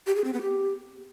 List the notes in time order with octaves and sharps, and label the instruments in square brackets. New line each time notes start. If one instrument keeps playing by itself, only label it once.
[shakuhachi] G4
G#4
C4
B3
G4